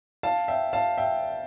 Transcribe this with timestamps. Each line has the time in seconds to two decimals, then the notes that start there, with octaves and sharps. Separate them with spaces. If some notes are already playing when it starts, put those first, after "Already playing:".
0.23 F5 A5
0.48 E5 G5
0.73 F5 A5
0.98 E5 G5